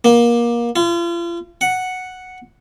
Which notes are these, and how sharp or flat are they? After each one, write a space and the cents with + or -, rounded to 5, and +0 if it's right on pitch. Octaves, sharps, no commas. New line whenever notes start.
A#3 +25
F4 -40
F#5 +0